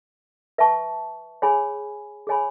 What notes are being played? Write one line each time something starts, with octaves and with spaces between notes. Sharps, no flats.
B4 E5 A5 C#6
G#4 C#5 G#5 B5
G#4 C#5 G#5 B5